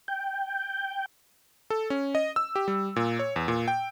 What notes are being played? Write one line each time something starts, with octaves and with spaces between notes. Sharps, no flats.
G5
A4
C#4
D#5
E6
G4
G3
A#2
C#5
E2
A#2
G5